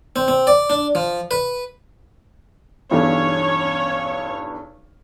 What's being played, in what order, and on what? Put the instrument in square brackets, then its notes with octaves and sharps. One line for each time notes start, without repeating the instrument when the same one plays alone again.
[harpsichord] C4
C4
D5
D4
F3
B4
[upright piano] B1 E2 G2 [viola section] C#4 C#5